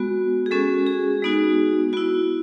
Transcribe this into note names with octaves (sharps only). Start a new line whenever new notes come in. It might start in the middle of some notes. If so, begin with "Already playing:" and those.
Already playing: G#3 B3 F#4
G#4
G#3 C#4 F#4 A4
G#4
G#3 B3 D#4 F#4
B3 E4 F#4